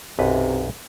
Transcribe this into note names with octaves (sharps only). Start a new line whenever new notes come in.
B1 F#2 C3 B4